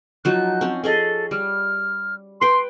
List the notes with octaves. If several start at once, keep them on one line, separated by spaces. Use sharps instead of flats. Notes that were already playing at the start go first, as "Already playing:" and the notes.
F3 F#3 D#4 F#6
C4 C#4
C#4 G#4 A4 D#5
G3 F6
B4 G5 C6